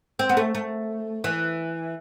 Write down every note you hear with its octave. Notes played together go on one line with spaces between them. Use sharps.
C4
B3
A3
A3
E3